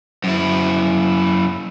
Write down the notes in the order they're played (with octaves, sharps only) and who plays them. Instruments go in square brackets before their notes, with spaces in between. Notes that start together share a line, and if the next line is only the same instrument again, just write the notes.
[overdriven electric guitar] F#2 E4